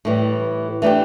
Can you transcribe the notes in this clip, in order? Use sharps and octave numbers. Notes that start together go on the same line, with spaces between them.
A2 E3 G3
E3 A3 D4 G4